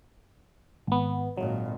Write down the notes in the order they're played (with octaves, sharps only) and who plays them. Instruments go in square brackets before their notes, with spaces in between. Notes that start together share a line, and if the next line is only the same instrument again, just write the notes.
[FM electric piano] G#1 B3
[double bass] G#1 A#2 [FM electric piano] F#3